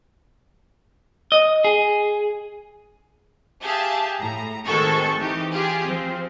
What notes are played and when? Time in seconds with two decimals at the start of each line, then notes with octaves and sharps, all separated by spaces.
1.32 D#5
1.65 G#4
3.62 G4 G#4 E5 F5 A5
4.20 A2 A#5
4.66 D#3 G#3 C4 F#4 A4 C#6
5.19 E3 D#4 G4
5.52 F4 G4 G#4
5.86 F3 C4